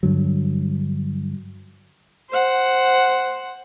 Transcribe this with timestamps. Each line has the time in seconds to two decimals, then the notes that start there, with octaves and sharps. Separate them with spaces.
0.03 G2 D3 F#3
2.30 C5 F#5